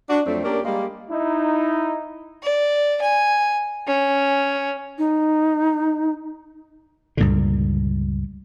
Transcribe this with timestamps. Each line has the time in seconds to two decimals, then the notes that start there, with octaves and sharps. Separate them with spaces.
0.10 D4 F#4
0.26 F2 F#3 A3 C4 D4
0.43 A#3 C#4 D4 G4 A#4
0.65 G3 G#3 A#3
1.11 D#4 E4
2.43 D5
3.01 G#5
3.87 C#4
4.98 D#4
7.17 C#2 G2 A#2 D3